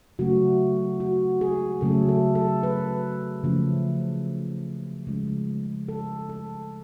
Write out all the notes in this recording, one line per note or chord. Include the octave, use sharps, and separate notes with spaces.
C#3 F#3 A3 F#4
F#4
G#4
C#3 F#3 A3 A4
A4
A4
B4
C#3 F3 A3
C#3 F3 G#3
A4
A4